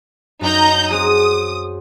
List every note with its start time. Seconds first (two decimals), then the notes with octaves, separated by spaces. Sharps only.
0.41 F#2 D#4 A#5 G6
0.91 C4 F#4 G#4 D#6